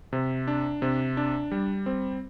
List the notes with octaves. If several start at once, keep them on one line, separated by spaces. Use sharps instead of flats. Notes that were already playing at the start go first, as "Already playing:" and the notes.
C3
D4
C3
D4
G3
C4